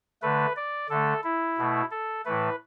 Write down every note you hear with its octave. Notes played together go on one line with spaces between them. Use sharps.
D3 A3 B4
D5
D3 A3 A4
E4
B2 A3
A4
A2 E3 A3 B4